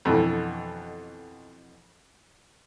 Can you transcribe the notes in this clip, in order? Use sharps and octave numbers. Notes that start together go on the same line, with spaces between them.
F2 B2 D3 E3